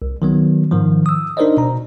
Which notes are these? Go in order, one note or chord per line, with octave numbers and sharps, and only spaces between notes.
C2
D#3 F#3 B3
G#2 D#3 F3
D#6 E6
D4 D#4 A#4 C5 D5 D#5
B2 A#5